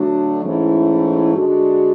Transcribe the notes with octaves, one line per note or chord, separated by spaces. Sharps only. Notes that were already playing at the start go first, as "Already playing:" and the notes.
Already playing: D3 F#3 A3 D4 F#4
G#2 E3 A3 C#4 E4
D3 G#3 D4 F#4